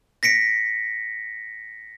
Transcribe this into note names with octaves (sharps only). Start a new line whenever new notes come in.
A#6 B6 C#7 D7